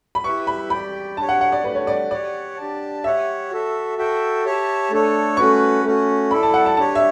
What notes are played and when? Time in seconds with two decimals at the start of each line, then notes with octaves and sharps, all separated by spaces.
0.15 B5
0.24 E4 G4 B4 E5 C#6
0.47 B5
0.70 G4 D5 G5 B5
1.17 D4 G4 C#5 A5
1.29 F#5
1.41 F#5
1.52 D5
1.64 A3 D4 G4 B4
1.75 C#5
1.87 D5
2.10 G4 C#5 D5 F#5
2.57 D4 G4 D5 A5
3.04 G4 C#5 E5 F#5
3.51 F#4 A4 E5
3.98 F#4 A4 E5 G5
4.44 G4 C#5 E5 A5
4.91 A3 D4 A4 C#5
5.37 A3 C#4 F#4 B4 C#6
5.84 A3 C#4 F#4
6.30 E4 A4 D5 B5
6.43 A5
6.54 F#5
6.66 A5
6.77 D4 G4 C#5 A5
6.95 E5